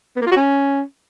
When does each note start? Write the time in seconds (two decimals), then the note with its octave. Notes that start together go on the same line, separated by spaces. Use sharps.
0.16 B3
0.21 A#3
0.26 F4
0.31 F#4
0.36 C#4